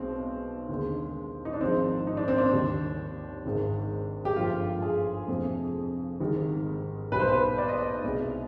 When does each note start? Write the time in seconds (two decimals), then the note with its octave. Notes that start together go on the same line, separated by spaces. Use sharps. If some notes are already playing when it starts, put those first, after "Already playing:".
Already playing: B1 B2 G#3 C4
0.69 D#2 D3 G#3
1.45 D#4
1.53 D4
1.61 G#1 G#2 F3 G#3 C4
2.07 D#4
2.17 D4
2.28 C4
2.38 D4
2.53 D#2 D#3 G3
3.45 G#1 G#2 D#3 G#3
4.25 G4
4.36 G1 G2 F3 G#3 F4
4.82 G#4
5.28 F2 C3 F3 G#3
6.20 G#1 G#2 D#3 G3
7.12 B1 B2 G3 B4
7.20 C5
7.28 B4
7.58 D5
7.69 D#5
7.78 D5
8.04 C2 B2 G#3